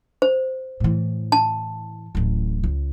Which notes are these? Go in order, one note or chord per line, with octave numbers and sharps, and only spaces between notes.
C5
A2 E3
A5
D1 A1
C#2